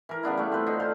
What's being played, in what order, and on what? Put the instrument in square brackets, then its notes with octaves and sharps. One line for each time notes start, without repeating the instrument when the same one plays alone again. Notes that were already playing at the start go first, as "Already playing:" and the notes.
[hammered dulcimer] E3 A#4
C#3 B3 D4 E4
G3 A3
C4 F4 B4 C5
D3 D#4
A4 C5 F5